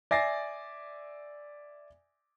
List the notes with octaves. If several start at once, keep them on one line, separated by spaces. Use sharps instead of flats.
D5 E5 G#5 A6 A#6 C7